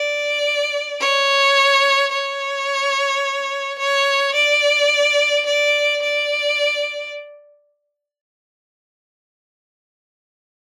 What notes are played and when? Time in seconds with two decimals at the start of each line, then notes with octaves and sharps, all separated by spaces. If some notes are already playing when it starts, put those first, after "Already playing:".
Already playing: D5
1.00 C#5
2.12 C#5
3.79 C#5
4.35 D5
5.46 D5
6.02 D5